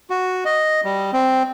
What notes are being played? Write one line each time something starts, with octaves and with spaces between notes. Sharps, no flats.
F#4
D#5
G3
C4